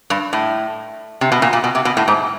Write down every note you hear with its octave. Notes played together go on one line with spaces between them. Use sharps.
G2
A2
C3
B2
A#2
A#2
B2
C3
B2
A2
G#2